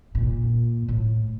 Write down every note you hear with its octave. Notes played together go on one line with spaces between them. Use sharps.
A#2
A2